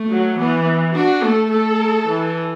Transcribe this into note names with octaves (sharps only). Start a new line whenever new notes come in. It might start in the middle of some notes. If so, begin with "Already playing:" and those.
Already playing: A3
F#3
E3 B3
D4 F#4
A3 A4
A3 A4
E3